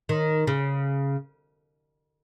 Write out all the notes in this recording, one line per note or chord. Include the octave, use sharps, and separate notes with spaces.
D#3
C#3